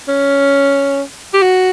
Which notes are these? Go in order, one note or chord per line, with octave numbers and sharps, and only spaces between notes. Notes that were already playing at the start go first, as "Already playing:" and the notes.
C#4
G4
F#4